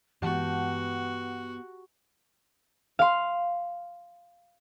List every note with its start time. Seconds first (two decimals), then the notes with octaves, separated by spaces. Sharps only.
0.22 G2 E3 G#3 B3 F#4 G4 F#5 A5
2.99 F5 C6